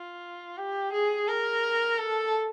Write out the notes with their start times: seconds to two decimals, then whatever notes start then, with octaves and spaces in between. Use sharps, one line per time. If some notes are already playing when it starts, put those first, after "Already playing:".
Already playing: F4
0.57 G4
0.93 G#4
1.28 A#4
1.98 A4